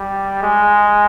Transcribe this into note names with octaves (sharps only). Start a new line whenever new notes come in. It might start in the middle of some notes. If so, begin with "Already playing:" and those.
Already playing: G3
G#3